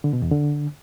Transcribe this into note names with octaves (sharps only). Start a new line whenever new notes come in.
D3
B2
E2
D3